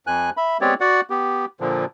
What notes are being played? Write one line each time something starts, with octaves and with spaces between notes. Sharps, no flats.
F2 G#5 F#6
E5 B5
G#3 B3 C4 G4 C#5 D5
F#4 D5 F#5
B3 G4
A#2 D3 F3